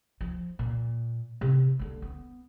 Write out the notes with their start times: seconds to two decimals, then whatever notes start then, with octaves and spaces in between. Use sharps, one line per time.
0.21 F3
0.59 A#2
1.41 C3
1.79 D3 A#3
2.02 B3